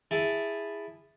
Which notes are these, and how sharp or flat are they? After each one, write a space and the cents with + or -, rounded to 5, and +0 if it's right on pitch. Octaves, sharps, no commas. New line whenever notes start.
E4 +0 G#4 -15 A5 +0